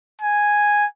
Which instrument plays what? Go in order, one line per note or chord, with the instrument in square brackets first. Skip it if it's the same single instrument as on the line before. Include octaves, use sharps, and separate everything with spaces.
[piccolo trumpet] G#5